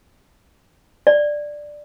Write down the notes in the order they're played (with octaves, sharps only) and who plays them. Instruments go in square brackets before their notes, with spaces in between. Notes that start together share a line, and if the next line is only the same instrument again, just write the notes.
[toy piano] D5